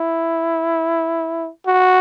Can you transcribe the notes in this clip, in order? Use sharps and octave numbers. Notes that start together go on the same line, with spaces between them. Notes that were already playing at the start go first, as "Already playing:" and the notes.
Already playing: E4
F#4